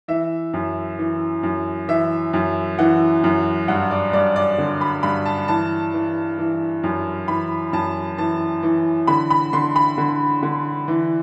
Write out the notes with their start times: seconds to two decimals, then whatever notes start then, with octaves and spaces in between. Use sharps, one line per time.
0.08 E3 E5
0.54 F#2
0.99 E3
1.43 F#2
1.88 E3 E5
2.33 F#2
2.79 E3 F#5
3.24 F#2
3.68 G2 F#5
3.91 D5
4.13 G2 D5
4.36 D5
4.58 D3
4.81 B5
5.03 G2 B5
5.26 A5
5.48 E3 A5
5.94 E3
6.38 E3
6.84 F#2
7.28 E3 B5
7.73 F#2 A5
8.18 E3 A5
8.63 E3
9.07 D3 B5
9.30 B5
9.53 D3 C6
9.76 B5
9.98 D3
10.43 D3
10.88 E3